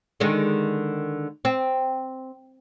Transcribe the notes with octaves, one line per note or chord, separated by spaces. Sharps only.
D3 D#3 G#3
C4